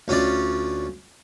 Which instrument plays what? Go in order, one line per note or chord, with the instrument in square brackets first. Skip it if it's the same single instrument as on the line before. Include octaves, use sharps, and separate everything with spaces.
[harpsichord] D2 C#4 F4 D5